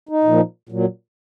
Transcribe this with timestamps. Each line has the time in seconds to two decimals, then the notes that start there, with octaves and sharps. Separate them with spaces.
0.09 D#4
0.24 A#2 F3
0.69 A#2 F#3